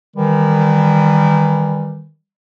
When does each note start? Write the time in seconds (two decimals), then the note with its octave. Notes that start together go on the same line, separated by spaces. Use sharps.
0.16 D#3 E3 G3